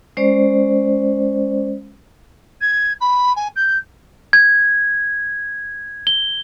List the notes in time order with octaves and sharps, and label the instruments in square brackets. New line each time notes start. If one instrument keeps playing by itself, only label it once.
[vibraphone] G#3 C#4 C5 D5
[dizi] G#6
B5
G#5
G6
[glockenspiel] G#6
G7